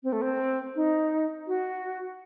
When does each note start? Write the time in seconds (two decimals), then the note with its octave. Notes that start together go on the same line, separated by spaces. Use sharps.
0.03 C4
0.12 A3
0.22 C4
0.76 D#4
1.47 F#4